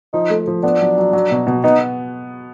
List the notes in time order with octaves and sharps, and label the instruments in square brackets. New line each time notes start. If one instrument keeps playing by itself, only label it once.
[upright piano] F3 [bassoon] D#4
[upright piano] A3
F3
[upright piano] B3 [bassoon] D4
[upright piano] F#3
F#3
F#3
B2
B2
[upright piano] B3 [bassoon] D#4